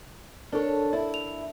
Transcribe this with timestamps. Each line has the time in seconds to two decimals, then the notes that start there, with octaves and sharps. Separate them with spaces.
0.52 D4 A4 A#4 C#5
0.93 E4 D5
1.14 F7